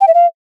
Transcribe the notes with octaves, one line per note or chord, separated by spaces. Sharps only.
G5
E5
F5